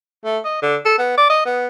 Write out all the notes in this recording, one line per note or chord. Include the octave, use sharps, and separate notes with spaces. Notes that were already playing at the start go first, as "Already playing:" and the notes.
A3
D#5
D3
A4
B3
D5
D#5
B3